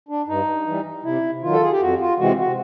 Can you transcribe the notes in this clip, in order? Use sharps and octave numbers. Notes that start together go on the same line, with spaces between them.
D4
G2 D#4
E3 G3
C3 E4
D#3 F#3 F4
A4
G#4
G4
F2 F#4
F4
C3 E3 G#3 C4 F#4
F#4